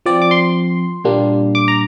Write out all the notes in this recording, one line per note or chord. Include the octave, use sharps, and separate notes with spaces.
F3 C4 D5
D6
C6
A#2 G3 A#3 D4
D6
A#5